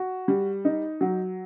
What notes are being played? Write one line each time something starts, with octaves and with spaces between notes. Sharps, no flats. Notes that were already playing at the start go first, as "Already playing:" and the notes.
Already playing: F#4
G3
D#4
F#3